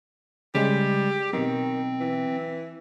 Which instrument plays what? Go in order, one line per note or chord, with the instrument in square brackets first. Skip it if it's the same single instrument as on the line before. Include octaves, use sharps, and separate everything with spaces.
[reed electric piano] C#3 G#3 [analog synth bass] G3 [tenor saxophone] G4
[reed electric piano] B2 F#3 [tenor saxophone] D#3 [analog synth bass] C4
[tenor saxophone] E3